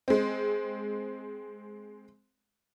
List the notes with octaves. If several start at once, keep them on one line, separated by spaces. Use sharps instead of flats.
G#3 C4